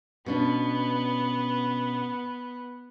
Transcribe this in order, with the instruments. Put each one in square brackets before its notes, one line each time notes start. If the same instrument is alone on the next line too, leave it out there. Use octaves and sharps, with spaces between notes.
[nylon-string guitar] B2 C#4 D4 [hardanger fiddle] B3